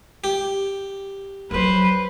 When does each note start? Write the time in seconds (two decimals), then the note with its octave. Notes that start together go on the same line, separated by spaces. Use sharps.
0.24 G4
1.51 F3 F#3 B4 C5